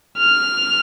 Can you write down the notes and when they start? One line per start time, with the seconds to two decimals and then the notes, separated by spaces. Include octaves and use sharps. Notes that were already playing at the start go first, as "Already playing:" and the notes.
0.18 F6